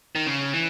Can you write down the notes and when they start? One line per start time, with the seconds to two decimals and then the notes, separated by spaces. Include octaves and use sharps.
0.15 D#3
0.27 C#3
0.53 E3